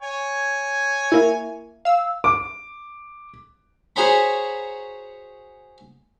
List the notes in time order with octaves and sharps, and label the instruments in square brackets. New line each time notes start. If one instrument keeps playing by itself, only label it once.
[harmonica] C#5 G#5
[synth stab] A#3 E4
F5 E6
[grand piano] D6
[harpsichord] F#4 G#4 C5 C#5 A#5 B5